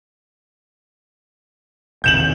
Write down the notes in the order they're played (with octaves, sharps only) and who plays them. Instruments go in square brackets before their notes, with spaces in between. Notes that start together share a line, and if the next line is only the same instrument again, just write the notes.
[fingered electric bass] E1 C3 D#3 [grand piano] G6 E7 F#7